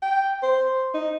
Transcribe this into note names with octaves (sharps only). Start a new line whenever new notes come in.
G5
C5
D#4